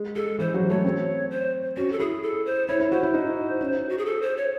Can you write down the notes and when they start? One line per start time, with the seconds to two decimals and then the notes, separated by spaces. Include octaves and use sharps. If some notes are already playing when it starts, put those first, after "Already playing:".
Already playing: G#3
0.16 G#3 A4
0.39 E3 C5
0.54 F#3
0.70 A3 C#5
0.85 C4
1.31 C5
1.76 C#4 F#4
1.92 A4
1.99 E4 G#4
2.23 A4
2.46 C5
2.68 E4 C#5
2.80 E4
2.91 F#4 C5
3.03 E4
3.14 D#4
3.61 C#4
3.89 F#4
3.98 G#4
4.06 A4
4.22 C5
4.37 C#5